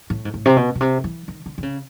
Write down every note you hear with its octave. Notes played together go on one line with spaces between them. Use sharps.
A2
G#2
A2
C3
B2
B2
C3
E3
D#3
D3
D3
C#3